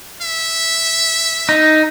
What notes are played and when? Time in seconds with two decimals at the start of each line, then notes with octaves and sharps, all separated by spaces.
0.21 E5
1.49 D#4